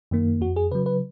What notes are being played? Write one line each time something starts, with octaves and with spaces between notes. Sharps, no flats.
F#2 D#3 A#3
F2 F#4
G#4
C#3 F#3 B4
B4